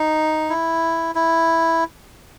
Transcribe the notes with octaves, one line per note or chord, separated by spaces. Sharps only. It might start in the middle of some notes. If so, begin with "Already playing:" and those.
Already playing: D#4
E4
E4